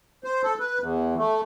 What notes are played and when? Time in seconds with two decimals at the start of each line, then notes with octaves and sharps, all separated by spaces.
0.24 C5
0.43 A4
0.60 B4
0.79 E2
1.17 A3